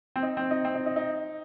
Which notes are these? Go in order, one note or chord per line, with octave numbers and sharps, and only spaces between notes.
C4
D#4
C4
D#4
C4
D#4
D#4
D#4